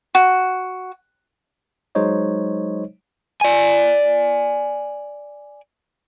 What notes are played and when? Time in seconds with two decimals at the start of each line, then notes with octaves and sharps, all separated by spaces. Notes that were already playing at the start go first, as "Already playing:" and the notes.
0.15 F#4
1.95 F#3 G#3 D#4 C5 C#5 D#5
3.41 D5 G#5